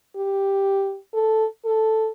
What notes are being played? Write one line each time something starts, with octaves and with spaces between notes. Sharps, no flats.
G4
A4
A4